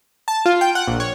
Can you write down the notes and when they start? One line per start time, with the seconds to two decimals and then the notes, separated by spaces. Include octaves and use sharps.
0.28 A5
0.46 F4
0.61 G5
0.75 F#5
0.87 A#1
1.00 C#5